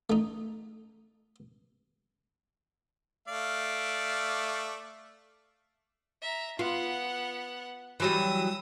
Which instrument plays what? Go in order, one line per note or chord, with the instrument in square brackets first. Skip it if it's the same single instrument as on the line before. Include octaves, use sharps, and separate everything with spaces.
[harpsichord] A3 D#4
[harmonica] A3 D5 F5
[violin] E5 A#5
[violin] B3 F#5 [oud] F4
[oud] E3 F#3 G3 [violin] D#6 E6